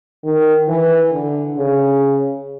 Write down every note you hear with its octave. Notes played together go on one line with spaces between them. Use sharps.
D#3
E3
D3
C#3